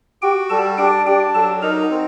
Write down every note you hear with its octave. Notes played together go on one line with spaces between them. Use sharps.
F#4 G4 G5
G3 A4 A5
D4 G4 G5
D4 G4 G5
F#3 A4 A5
D#4 A#4 A#5
C4